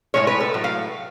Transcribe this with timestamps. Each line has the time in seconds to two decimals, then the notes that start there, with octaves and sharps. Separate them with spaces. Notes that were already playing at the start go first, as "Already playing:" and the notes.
0.14 A2 F3 G#3 C#5
0.27 B4
0.40 A4
0.54 A2 F#3
0.64 F5